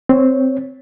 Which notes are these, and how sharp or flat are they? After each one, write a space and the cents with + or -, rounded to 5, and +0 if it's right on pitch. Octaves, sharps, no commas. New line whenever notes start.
C4 -5 C#5 +0